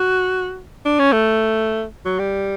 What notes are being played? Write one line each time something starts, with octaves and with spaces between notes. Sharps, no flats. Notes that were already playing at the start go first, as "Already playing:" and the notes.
Already playing: F#4
D4
C#4
A3
F#3
G3